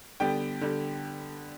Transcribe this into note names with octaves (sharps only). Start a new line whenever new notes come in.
D3 G3 B3 G5
D3 G3